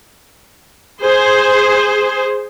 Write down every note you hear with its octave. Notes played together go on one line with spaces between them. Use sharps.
G#4 C5